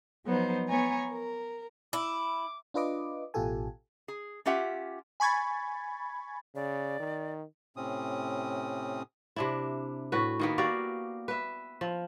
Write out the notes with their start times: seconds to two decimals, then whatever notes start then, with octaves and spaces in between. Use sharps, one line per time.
0.25 F3 F#3 B3 D#4 C5
0.67 B3 C#5 G#5 A#5
1.09 A#4
1.93 E4 D6
2.74 D4 F4 B4 D#5 D6
3.34 A1 B2 F4 G4 A4 G#5
4.08 G#4
4.46 C#4 F4 G4 E5 F#5
5.20 G#5 B5 C#6 G#6 A6
6.55 C#3 D5
7.00 D#3
7.77 A2 C3 C4 C#4 D#6
9.36 C3 D4 E4
10.12 A2 F#4 B4
10.40 D#3 A#3 B3
10.58 F#4 G4 D5 F5
11.28 B4 E5
11.81 F3